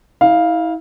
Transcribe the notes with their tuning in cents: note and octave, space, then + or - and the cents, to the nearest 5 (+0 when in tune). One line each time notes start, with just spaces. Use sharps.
E4 -35 F5 +0